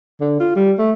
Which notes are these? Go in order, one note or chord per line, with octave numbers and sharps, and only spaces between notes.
D3
F4
G3
A3